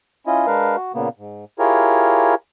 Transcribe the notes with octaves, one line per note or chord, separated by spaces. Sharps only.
C#4 E4 F4 D#5
G#3 D4 A#4 B4 F5
F#4
A#2 C#3 A#3 B3
G#2
E4 F4 G4 G#4 A#4 C#5